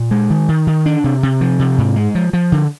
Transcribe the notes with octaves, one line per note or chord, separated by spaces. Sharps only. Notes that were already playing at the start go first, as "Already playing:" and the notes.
Already playing: A#2
G#3
D#3
D#3
D#3
D4
C3
C3
F3
C3
G#2
G#3
F3
F3
D3